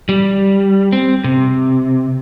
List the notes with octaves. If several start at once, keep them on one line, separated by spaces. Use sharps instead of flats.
G3
C4
C3